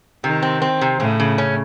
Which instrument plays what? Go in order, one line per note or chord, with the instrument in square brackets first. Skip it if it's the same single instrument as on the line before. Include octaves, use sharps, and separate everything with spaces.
[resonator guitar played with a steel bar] C3 [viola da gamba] D#3
[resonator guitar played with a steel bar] C4
C4
C3
[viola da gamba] A2 [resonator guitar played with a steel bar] C#3
[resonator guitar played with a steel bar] C#3
C#4